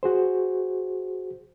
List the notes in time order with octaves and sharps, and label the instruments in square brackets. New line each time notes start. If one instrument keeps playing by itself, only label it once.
[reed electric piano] F#4 G#4 C5